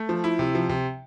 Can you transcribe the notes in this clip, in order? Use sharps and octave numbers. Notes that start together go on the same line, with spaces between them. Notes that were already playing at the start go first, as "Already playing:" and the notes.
Already playing: A3
F3
E4
C3
F3
C3